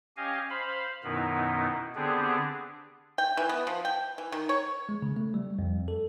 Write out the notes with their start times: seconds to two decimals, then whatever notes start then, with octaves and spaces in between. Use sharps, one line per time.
0.17 C#4 G4 D#5 F5 G#5
0.50 C5 F5 B5
1.04 F#2 B2 D#3 B3 D#4 E4
1.95 D3 B3 C4 D4 G4 G#4
3.18 G5
3.37 E3
3.49 B3
3.67 F3
3.85 G5
4.18 E3
4.32 D#3
4.49 C#5
4.89 G#3
5.02 C#3
5.16 A3
5.34 G3
5.59 F2
5.88 A4